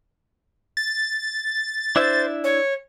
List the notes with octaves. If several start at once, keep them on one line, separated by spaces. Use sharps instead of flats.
A6
D4 E4 C5 E5
C#5